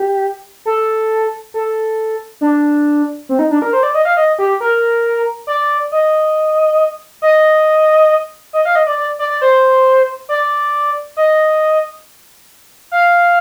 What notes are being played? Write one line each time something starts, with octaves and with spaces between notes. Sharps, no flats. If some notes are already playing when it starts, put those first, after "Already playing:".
Already playing: G4
A4
A4
D4
C4
D#4
D4
A#4
C5
D5
D#5
F5
D#5
G4
A#4
D5
D#5
D#5
D#5
F5
D#5
D5
D5
D5
D5
C5
D5
D#5
F5